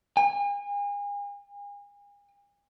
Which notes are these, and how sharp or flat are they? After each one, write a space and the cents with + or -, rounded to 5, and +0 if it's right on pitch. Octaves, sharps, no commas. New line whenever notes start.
G#5 -40